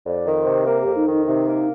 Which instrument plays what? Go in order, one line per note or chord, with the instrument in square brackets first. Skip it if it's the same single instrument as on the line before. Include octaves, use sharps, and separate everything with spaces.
[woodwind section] F2 [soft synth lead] D5
[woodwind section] D#3
[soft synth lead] C5
[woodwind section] C3
[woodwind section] A#3 [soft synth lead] A#4
[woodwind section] F2 [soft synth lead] G4
[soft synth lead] D#4
[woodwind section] D#3 [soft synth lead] D#4
[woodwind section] C3 [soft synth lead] D#4
[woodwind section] A#3